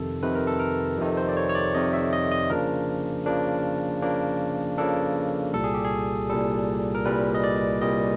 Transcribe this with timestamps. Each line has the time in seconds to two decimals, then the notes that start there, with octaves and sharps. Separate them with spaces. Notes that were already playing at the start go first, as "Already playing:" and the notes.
Already playing: F2 C3 D#3 A4
0.23 F2 C3 D#3 B4
0.35 A#4
0.47 A4
0.60 A#4
0.98 F2 C3 D#3
1.17 C5
1.29 D5
1.37 C#5
1.49 C#5
1.55 D5
1.74 F2 C3 D#3 D#5
1.93 E5
2.13 D#5
2.31 D#5
2.50 C#3 F3 A#3 D4 A#4
3.26 C#3 F3 A#3 D4
4.02 C#3 F3 A#3 D4
4.78 C#3 F3 A#3 D4 A4
5.54 C2 A#2 G3 A4
5.64 G#4
5.74 G4
5.85 G#4
6.29 C2 A#2 G3 A4
6.95 A#4
7.05 C2 A#2 G3 B4
7.35 D#5
7.44 D5
7.81 C2 A#2 G3 D#5